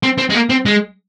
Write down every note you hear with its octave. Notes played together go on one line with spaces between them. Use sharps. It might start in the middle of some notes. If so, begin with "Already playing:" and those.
C4
C4
G#3
A#3
C4
G#3